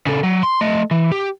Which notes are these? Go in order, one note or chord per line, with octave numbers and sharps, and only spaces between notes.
C#3 A4
F#3
C6
A3 D#5
E3
G4